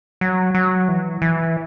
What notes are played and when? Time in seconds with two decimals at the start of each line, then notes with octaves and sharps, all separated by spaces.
0.21 F#3
0.55 F#3
0.88 E3
1.22 E3